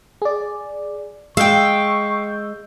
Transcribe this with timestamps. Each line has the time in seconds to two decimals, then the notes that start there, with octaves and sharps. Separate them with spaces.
0.22 G#4 D5
1.37 G#3 F5 G5 C#6 E6 G6